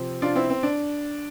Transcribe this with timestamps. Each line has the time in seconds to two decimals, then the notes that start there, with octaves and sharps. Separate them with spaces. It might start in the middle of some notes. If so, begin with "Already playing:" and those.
Already playing: C3 F3 C4
0.22 D4 F4
0.35 C4 E4
0.50 C4
0.63 D4